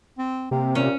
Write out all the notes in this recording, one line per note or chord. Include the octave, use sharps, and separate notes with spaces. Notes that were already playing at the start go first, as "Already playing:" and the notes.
C4
C3 A#3 G4
A#2 C#4